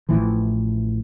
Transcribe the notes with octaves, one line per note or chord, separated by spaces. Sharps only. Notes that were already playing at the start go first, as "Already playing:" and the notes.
A1 A2 E3 F3